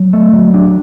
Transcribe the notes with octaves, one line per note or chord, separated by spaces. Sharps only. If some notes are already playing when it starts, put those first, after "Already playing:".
Already playing: F#3
A3
F#3
D4